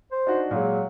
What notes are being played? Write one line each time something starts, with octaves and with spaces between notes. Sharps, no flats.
C5
D4 D#4 F#4
A#2 F#3 G#3